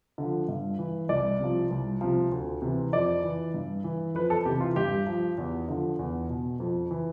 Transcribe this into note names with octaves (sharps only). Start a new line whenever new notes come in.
D3 F3
G2
E3
C2 D5
C3 F3
C2
C3 F3
D2
C3 E3
F2 D5
E3
G2
E3
F2 B4
A4
C3 E3 G4
F4
G2 G4
F3
E2
D3 F3
E2
B2
F2
E3